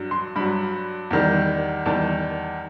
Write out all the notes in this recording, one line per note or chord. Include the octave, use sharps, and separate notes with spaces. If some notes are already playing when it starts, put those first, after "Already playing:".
Already playing: G2 F#3
C6
G2 F#3 B5
E2 D#3 G3
E2 D#3 G3 A5